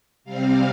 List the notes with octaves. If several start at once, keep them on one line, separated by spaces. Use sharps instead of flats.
C3 G3 C4 F5